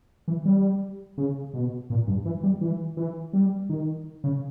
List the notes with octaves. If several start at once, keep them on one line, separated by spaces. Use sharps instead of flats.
E3
G3
C#3
B2
A#2
G2
E3
G3
E3
E3
G3
D#3
C#3